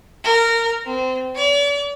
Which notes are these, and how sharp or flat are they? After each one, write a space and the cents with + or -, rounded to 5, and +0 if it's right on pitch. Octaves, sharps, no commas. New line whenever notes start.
A#4 -15
C4 -20
D5 -45